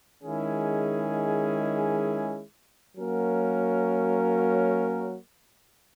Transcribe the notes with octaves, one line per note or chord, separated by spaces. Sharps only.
D#3 G#3 C#4 E4 G#4
F#3 A#3 C#4 F#4 A#4